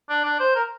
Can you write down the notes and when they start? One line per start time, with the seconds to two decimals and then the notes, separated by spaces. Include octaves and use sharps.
0.09 D4
0.25 D4
0.40 C5
0.55 A#4